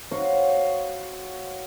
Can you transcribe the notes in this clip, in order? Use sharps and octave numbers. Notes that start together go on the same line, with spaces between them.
F#4 C5 C#5 F5